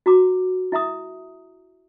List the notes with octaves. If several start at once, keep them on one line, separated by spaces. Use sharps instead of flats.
F#4 A#5 D6
E4 E5 A#5 D#6